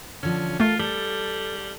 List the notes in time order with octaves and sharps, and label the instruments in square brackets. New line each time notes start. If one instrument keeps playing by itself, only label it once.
[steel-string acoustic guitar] D3 F3 [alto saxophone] C#4
[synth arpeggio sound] A3 A#4 [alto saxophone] F4 [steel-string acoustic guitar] A4
[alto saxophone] G3 [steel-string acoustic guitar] A4